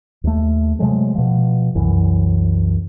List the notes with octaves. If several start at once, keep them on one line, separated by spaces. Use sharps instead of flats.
D#2 A3
C3 F#3 G#3 A3
B2 F3
C2 F#2 E3